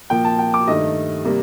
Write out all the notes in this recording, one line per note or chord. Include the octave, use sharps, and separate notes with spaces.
A#2 F3 A#3 G5
A5
G5
D6
G2 D#3 A3 D#5
C3 G3 A#3